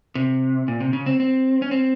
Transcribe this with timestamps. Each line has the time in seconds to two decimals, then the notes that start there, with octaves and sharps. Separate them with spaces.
0.15 C3
0.68 A#2
0.80 C3
0.93 C#3
1.06 C4
1.20 C4
1.62 C#4
1.71 C4